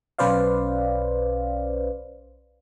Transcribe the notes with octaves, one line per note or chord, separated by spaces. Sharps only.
B1 C#4 B4 C5 D5 F5